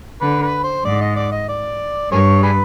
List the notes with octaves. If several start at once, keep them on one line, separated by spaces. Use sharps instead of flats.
D3 B4
B4
C5
G#2 D5
D#5
D5
D#5
D5
G2 G#4 A#4 C#5
D4 G#4 B4